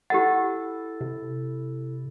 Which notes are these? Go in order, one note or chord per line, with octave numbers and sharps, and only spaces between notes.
E4 G4 A4 F#5 A6
C3